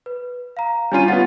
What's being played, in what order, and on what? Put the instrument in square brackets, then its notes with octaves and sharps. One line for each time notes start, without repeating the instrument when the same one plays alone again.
[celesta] B4
F5 A#5
[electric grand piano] G3 C#4 F4 [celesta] D4 G#5 D#7
[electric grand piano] B3 C#4 F4 [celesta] F#5 A6